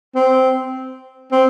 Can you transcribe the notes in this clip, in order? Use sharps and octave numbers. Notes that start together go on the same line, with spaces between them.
C4
C4